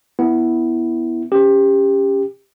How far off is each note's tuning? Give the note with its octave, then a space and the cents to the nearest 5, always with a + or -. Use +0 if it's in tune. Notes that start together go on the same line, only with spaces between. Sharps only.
B3 -5 E4 +0
C#4 +0 G4 +20